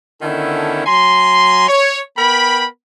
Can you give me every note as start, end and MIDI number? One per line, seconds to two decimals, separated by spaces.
0.22 0.86 50
0.22 0.86 51
0.22 0.86 59
0.22 0.86 61
0.22 0.86 64
0.22 0.86 69
0.86 1.68 54
0.86 1.68 80
0.86 1.68 82
0.86 1.68 84
1.69 2.01 73
2.18 2.67 59
2.18 2.67 70
2.18 2.67 79
2.18 2.67 83